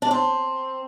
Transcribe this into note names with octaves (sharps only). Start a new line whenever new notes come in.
D4
C4